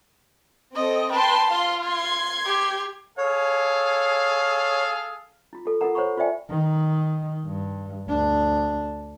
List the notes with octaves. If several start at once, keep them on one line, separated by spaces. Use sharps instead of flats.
C4 A4 D#5
B4 G5 A5 C6
F4 F5 C6
C6 G#6
G4
G#4 A4 C#5 F5
E4 F4
F4 A4
E4 F4 A4 A#4 F#5 A#5
C5 C#5 F#5 A#5 B5 C#6
F4 C5 D5 E5 G5 G#5
D#3
G2
D2 D4